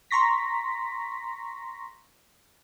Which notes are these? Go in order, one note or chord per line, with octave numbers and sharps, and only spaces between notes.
A#5 C6 C#6 A#6 B6